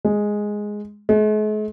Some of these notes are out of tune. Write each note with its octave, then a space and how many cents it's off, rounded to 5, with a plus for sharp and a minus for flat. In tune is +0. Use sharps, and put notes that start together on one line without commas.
G#3 +0
G#3 +45